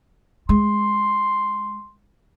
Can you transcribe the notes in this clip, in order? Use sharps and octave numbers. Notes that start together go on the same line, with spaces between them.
G#3 C6